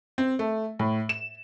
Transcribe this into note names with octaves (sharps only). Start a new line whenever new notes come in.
C4
A3
A2
E7